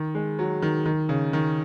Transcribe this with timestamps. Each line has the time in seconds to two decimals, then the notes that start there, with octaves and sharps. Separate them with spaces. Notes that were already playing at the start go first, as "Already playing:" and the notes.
Already playing: D#3
0.15 G#3
0.39 F#3
0.62 D#3
0.86 D#3
1.09 C#3
1.33 D#3